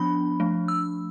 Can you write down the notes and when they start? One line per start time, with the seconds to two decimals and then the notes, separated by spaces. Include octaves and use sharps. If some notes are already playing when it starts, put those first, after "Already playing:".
Already playing: F3 B3 D4 B5
0.40 F3 A3 D4
0.68 E6